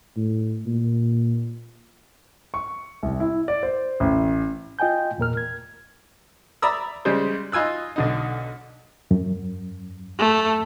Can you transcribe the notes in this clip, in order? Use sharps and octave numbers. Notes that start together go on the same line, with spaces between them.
A2
A#2
C#6
C2
E4
D5
C5
A1
F4 D#5 G5 G#5 G6
E2 A#2 A#4 F6
G#6
D5 E5 A#5 B5 D#6 E6
C#3 G3 G#3 C5
D#4 F4 G#5 E6 F#6
B1 D3 D#4
F#2
A3